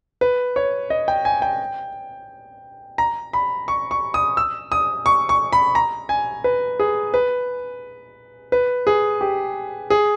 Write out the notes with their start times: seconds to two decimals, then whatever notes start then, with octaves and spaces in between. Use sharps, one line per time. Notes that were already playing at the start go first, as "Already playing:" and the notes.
0.21 B4
0.56 C#5
0.90 D#5
1.08 G5
1.25 G#5
1.42 G5
2.98 A#5
3.33 B5
3.68 C#6
3.91 C#6
4.14 D#6
4.37 E6
4.72 D#6
5.06 C#6
5.29 C#6
5.53 B5
5.75 A#5
6.09 G#5
6.44 B4
6.80 G#4
7.14 B4
8.52 B4
8.87 G#4
9.21 G4
9.90 G#4